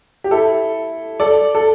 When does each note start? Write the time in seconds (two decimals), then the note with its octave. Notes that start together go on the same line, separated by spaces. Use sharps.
0.24 G4
0.31 E4 A4
1.20 A4 D5
1.55 A4